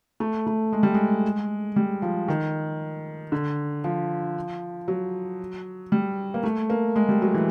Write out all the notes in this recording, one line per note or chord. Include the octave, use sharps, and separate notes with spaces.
A3
A3
G#3
G3
G#3
G3
F3
D#3
D3
F3
F#3
G3
A#3
A3
A#3
G#3
G3
F#3
E3